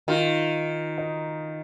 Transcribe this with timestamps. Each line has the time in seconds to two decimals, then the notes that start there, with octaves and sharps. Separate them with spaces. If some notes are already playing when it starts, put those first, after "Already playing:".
0.08 D#3 F4
0.98 D#4